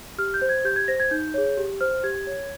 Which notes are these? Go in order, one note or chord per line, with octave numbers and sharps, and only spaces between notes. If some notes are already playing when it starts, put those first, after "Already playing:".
G4 F6
G6
C5
G#6
G4 G6
G#6
C5 A#6
G#6
D#4 G6
G#4 C#5
G4
C5 F6
G4 G#6
C#5